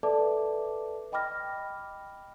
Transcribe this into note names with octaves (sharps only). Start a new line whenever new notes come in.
A4 B4 D5 E5 A5 D6
D#5 G5 B5 D6 F6 A#6